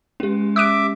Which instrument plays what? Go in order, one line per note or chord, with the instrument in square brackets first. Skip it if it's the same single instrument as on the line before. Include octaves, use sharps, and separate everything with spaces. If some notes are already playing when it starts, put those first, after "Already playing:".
[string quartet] G#3 [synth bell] C#4 G4
[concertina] E5 D6 [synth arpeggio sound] D#6 F#6 D7